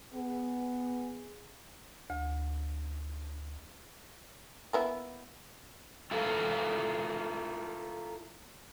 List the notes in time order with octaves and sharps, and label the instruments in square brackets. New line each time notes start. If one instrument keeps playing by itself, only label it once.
[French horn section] B3 G#4
[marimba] D2
[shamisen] A#3 B3 E4
[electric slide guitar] E4 F4 A4 A#4 F5